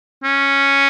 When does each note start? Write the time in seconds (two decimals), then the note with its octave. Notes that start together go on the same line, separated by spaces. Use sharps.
0.24 C#4